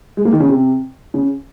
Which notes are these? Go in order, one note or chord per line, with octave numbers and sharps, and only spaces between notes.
G#3
A#3
D#3
C#3
C3
C#3